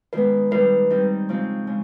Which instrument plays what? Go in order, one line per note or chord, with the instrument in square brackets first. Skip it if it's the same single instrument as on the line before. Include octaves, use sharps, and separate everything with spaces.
[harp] D#3 G#3 B3 [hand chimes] B4
[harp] D#3 G3 C4 D#4 [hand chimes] B4
[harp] D#3 G3 C4 D#4
C#3 F3 G#3 C4 D#4
C#3 G#3